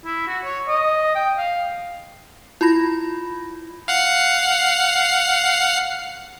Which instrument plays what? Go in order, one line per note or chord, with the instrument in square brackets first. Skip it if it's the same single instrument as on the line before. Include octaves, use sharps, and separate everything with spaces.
[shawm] E4
F#4
C#5
D#5
G5
F5
[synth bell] E4 F4 B5 A#6
[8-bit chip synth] F5 F#5 C7